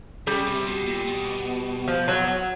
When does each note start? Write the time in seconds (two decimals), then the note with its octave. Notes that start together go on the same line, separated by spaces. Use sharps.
0.27 C#3 G3
0.47 C3
0.67 B2
0.87 A#2
1.08 B2
1.88 F3
2.08 F#3
2.27 F#3